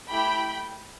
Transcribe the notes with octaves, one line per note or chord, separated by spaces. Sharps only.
A3 E4 G4 G5 B5